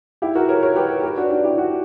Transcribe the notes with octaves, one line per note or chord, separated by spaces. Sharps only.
E4 G4
F#4 A#4
A#4 C#5
A#4 C#5
G4 B4
G4 B4
D4 F#4
D4 F#4
E4 G4
D4 F#4